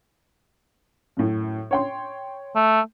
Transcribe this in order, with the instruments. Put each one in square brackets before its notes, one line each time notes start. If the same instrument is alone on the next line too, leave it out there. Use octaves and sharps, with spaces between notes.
[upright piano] F#2 A2
C#5 G5 C6
[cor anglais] A3